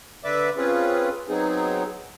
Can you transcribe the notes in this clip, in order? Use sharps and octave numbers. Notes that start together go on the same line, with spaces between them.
D3 B4 D5 E5 D6
C4 C#4 F4 G#4 B4
F#3 B3 C4 D#4 G#4